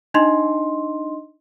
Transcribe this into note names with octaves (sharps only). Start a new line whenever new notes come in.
D4 D#4 D#5 C6